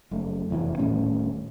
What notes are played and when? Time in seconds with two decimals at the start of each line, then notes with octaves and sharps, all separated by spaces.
0.11 F#1 F#2 A3
0.50 F1 E2 G2 E3
0.78 D#1 A2 C#4